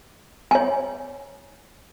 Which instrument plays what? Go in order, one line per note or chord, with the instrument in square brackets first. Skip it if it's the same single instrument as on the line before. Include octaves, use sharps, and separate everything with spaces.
[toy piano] C#5 G#5